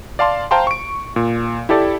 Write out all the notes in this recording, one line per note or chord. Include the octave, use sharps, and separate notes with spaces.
D5 F5 A5 C6
C5 F5 G5 A5 A#5 C6
C#6 D7
A#2
E4 G4 A4 D5